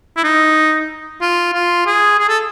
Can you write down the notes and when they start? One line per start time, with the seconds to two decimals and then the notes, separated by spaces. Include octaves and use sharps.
0.17 E4
0.24 D#4
1.22 F4
1.54 F4
1.87 G#4
2.19 G#4
2.29 A4